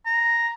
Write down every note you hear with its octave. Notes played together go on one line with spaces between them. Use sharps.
A#5